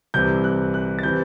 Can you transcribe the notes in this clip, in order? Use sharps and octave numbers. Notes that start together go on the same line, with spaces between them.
C2 C3 E3 G6
F#6
F#6
A6
C3 E3 G6